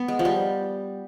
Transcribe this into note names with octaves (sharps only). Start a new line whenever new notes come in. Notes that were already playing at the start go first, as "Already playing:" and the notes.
Already playing: B3
G#3
F3
G3